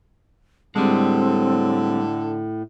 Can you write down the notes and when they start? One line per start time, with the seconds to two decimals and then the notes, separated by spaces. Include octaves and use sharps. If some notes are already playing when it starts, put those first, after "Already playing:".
0.76 A2 D3 G3 G#3 C4